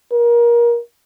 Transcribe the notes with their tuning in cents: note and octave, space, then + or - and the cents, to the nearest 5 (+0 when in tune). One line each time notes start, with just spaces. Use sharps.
A#4 +25